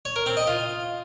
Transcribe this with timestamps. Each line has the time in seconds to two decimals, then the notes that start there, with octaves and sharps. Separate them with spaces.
0.05 C#5
0.16 A#4
0.26 C4
0.37 D#5
0.47 F4